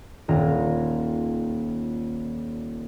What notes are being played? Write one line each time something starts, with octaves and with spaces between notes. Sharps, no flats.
D#1 F4 A#5